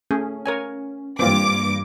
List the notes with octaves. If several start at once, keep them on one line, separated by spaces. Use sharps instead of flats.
A3 C#4 G#4
A#4 C#5 G#5
G2 E3 A#3 C4 F4 D6